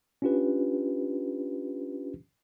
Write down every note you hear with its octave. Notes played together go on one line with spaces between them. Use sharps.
C#4 D4 F4 G4 B4